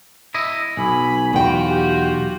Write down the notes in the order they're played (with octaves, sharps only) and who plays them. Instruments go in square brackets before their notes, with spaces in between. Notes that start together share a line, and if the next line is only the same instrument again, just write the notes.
[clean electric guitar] E4 D#5
[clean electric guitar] B1 [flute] G#5 [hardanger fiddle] B5
[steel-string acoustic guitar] E2 G5 [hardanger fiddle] F4 F#4
[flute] G4